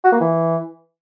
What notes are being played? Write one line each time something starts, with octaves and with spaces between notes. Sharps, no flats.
F#4
A#3
E3